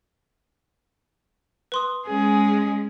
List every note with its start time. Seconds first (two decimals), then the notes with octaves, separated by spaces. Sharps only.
1.72 B4 C6 D#6
2.07 G#3 C#4 G#4